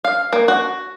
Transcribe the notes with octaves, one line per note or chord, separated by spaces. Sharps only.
F5
A#3
F#4